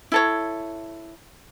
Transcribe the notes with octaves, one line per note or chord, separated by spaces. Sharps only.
E4 A4 C#5